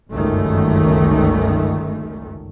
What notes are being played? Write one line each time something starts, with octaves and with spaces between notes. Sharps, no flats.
G1 C#2 F#2 D#3 A3